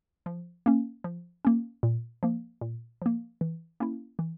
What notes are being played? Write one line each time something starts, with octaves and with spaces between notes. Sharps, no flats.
F3
A#3 C#4
F3
A#3 C#4
A#2
F3 A#3
A#2
F3 A#3
E3
A#3 C#4 E4
E3